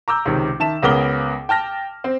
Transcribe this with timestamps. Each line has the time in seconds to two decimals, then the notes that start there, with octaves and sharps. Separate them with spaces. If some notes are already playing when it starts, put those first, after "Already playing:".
0.08 A#5 D6 E6 G6
0.25 C#2 C3 D#3
0.60 D#3 E5 A5 E7
0.82 C#2 C#3 B3 A#4 D6 G7
1.49 G5 A5 F6 A#6
2.04 C4